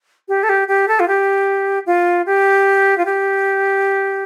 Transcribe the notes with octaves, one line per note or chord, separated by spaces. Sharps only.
G4
A4
G4
G4
A4
F4
G4
F4
G4
F4
G4